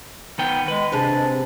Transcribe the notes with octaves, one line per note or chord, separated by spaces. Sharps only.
D#3 B3 G5
G#3 B4
C3 G#3 C4 D4